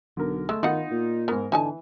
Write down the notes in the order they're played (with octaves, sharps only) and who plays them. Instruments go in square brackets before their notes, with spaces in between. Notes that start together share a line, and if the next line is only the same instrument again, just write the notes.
[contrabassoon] B1 [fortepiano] D3 A#4
[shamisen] G#3 [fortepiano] A3 E6
[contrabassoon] D#3 [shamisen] B3 F#5 [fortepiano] D#4 F4
[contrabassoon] A#2
[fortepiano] G#2 A#4 [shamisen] B3
[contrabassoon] D3 [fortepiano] E3 [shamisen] D#4 G#5 A5